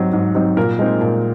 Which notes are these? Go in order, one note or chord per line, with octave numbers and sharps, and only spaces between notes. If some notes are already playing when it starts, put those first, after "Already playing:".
Already playing: G#2 F#3 C4 D#4
G#2
F#3 C4 D#4
A#2 A#4
G#3 C4 D#4
A#2